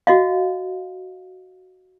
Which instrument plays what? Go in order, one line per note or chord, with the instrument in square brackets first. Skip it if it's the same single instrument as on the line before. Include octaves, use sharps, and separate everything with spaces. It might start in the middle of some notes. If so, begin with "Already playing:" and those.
[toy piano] F#4 D#5 F5